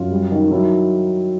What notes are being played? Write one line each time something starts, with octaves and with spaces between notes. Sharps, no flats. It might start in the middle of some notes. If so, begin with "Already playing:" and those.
Already playing: F#2 F4
G3
D#3
F#3 E4